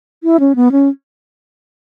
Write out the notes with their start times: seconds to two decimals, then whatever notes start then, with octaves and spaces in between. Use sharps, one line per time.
0.24 E4
0.40 C#4
0.56 B3
0.72 C#4